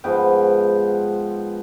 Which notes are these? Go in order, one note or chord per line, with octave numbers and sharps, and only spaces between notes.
G#2 F3 G#3 B3 G5